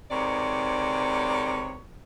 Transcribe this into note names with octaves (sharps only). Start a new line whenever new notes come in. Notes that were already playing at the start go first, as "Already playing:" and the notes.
G#2 C3 A#4 B4 C#5 D5